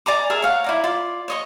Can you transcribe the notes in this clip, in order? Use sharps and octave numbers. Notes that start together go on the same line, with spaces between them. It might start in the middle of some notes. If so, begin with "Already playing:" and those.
D5 G#5 A#5 D6
G#4 A#4 E5
C#5 F5 F#5
E4 D5 A#5
F4 D5
C#5 D#5 C#6